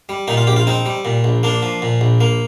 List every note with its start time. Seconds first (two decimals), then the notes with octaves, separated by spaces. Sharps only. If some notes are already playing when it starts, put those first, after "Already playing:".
0.09 G3
0.28 A#2 D#4
0.37 F4
0.47 A#1 G4
0.56 F4
0.67 C4 D#4
0.86 G3
1.05 A#2
1.24 A#1
1.43 A#3 D4
1.63 F3
1.82 A#2
2.01 A#1
2.21 A#3